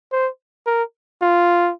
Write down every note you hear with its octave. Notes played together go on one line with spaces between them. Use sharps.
C5
A#4
F4